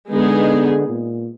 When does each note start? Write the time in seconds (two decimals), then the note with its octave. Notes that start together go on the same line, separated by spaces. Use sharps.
0.11 D3 G#3 B3 D#4 G#4
0.89 A#2